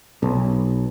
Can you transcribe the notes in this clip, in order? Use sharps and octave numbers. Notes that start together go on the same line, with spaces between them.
B1